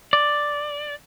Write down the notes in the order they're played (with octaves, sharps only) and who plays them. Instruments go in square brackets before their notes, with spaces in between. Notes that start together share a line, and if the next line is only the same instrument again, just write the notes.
[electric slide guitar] D5